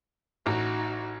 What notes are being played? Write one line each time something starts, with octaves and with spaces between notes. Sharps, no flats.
A1 D#4 F#4 A#5